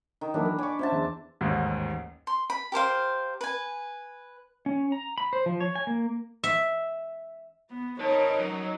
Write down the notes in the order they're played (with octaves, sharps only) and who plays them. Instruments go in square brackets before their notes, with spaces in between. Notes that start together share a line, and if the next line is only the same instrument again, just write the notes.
[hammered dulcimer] D#3
[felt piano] E3 F#3 A#3 [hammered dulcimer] D4 B5
[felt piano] A#4 [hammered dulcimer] B4
[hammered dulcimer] D5 D6 [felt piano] G#5 C#6
[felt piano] C#4 [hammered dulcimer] C5 E5 A5
[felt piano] E2
[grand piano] A1 D#2 G#2
[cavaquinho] C6
B5
G4 A#4 C5 F5
B4 G#5
[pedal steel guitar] C#4
A#5
B5
C5
F3
C#5
G#5
A#3
[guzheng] E5
[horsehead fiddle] B3
[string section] D#4 A#4 [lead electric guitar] B4 A5 [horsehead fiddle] C#5
[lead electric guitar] F#3 [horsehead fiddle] C#4